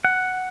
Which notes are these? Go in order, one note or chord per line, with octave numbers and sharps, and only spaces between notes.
F#5